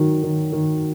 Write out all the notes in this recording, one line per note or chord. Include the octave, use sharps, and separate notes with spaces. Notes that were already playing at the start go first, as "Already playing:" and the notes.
Already playing: D#3 F#3
D#3
D#3